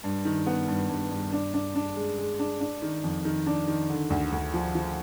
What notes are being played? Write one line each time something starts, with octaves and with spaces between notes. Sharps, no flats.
G2
D#3
B3
G2
G2
G2
D4
D4
D4
G#3
G#3
D4
D4
D#3
F2
D#3
D4
D#3
D3
D2
D2
F3
F3